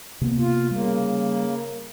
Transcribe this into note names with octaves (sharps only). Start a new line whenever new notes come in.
C3 A#3 B3
F4
C#3 G3 A#3